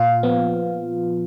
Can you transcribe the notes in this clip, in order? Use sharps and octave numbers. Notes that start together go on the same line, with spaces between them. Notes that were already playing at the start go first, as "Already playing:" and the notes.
Already playing: A#2 F4 F5
F3 B3